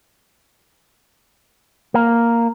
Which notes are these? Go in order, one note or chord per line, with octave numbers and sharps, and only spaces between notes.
A#3